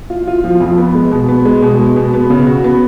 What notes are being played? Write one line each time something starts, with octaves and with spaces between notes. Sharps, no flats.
F4
F4
F3
F2
B3
G#3
B2
B3
G#3
B2
G#3
B2
B3
C#3
F#4
B3